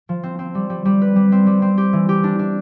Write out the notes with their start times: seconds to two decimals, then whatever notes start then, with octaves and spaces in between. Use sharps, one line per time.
0.09 F3
0.23 C4
0.39 C4
0.55 G3
0.70 G3
0.85 G3
1.02 B4
1.16 G3
1.32 C4
1.47 G3
1.62 C4
1.78 G4
1.93 E3
2.09 G4
2.24 D4
2.39 D4